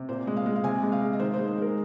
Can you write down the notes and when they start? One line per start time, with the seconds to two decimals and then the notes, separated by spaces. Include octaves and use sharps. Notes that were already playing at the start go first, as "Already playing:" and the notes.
Already playing: C3
0.09 A#2 C5
0.27 G#3
0.36 F5
0.46 G#3
0.56 F5
0.64 C3 G#5
0.83 G#3
0.92 F5
1.01 G#3
1.13 D#5
1.20 D#3 C5
1.34 C5
1.38 G#3
1.48 C5
1.57 G#3 A#4